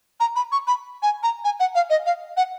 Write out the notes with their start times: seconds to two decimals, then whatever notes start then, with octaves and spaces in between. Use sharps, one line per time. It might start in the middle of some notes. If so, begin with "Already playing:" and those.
0.20 A#5
0.36 B5
0.52 C#6
0.67 B5
1.03 G#5
1.23 A#5
1.45 G#5
1.60 F#5
1.75 F5
1.90 D#5
2.06 F5
2.37 F#5